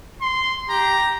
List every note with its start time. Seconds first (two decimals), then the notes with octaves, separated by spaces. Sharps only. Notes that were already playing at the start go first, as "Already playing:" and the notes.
0.22 C6
0.69 G4 A#5